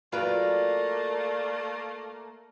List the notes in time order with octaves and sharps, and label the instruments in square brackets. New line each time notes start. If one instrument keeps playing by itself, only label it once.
[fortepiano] F#3 F4 B4 [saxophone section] A3 A#3 [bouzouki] A#4 D5 F5